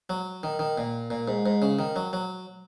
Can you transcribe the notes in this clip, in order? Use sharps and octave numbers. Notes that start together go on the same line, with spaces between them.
F#3
D#3
D#3
A#2
A#2
G#2
G#2
C#3
D#3
F#3
F#3